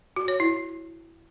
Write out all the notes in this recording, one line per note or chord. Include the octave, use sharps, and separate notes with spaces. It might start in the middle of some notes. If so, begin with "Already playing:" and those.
F#4
C#5
E4